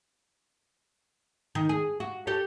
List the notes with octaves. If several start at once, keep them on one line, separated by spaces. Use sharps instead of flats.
D#3
G#4
F#4
G4 A4 C#5